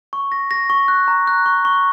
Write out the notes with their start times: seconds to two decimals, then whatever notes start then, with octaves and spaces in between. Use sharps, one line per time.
0.13 C#6
0.32 A#6
0.51 A#6
0.70 C#6
0.88 F#6
1.08 A#5
1.27 F#6
1.46 C#6
1.65 C#6